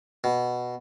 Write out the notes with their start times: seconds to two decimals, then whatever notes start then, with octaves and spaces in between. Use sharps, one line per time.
0.24 B2